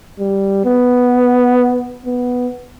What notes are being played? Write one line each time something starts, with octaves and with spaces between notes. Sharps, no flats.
G3
B3
B3